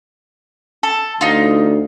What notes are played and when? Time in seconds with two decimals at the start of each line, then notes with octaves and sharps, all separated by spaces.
0.83 A4
1.21 D2 D#4 F4